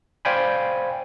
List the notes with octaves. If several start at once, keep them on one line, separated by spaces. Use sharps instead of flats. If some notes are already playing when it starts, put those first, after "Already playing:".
C5 D5 F5 G5 G#5 B5